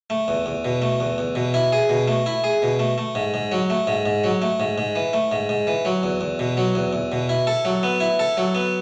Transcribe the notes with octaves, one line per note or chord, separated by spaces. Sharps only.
A3
E2
E2
B2
A3
E2
E2
B2
E4
G#4
B2
A3
E4
G#4
B2
A3
A3
G#2
G#2
F#3
A3
G#2
G#2
F#3
A3
G#2
G#2
E3
A3
G#2
G#2
E3
F#3
E2
E2
B2
F#3
E2
E2
B2
E4
A4
F#3
B3
E4
A4
F#3
B3